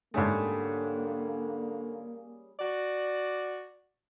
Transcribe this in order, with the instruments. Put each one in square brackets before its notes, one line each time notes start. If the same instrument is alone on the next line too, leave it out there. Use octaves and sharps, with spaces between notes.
[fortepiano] G#2 A3 [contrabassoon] D3 [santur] G3 C#4 G#4 [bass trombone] A#3
[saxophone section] F#4 D5